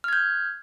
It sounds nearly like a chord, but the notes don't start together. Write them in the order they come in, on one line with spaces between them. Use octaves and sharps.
F6 G#6 G6